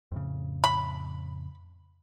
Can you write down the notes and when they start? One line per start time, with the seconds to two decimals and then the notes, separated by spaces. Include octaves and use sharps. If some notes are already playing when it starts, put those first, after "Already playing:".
0.12 F2 A2 C#3
0.64 B5